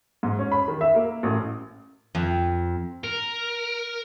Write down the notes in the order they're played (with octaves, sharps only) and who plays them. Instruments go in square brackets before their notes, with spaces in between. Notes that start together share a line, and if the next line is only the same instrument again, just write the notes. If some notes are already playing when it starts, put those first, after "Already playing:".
[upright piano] G#2
C#4
B5
D#3
E5
A#3
A1
[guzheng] F2
[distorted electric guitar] A#4